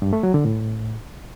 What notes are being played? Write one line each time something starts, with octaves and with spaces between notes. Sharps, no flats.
G2
A3
F#3
D3
A2